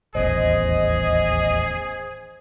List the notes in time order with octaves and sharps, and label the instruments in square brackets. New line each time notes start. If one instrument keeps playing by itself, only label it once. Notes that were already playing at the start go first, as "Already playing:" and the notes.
[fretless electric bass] D#1 A1 E2 [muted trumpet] G#4 [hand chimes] C5 [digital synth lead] D#5